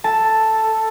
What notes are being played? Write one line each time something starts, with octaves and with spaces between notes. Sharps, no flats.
A4 A5